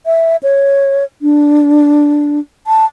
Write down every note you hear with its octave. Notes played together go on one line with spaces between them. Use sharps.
E5
C#5
D4
A5